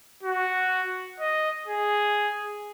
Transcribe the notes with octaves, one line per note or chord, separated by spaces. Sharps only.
F#4
D#5
G#4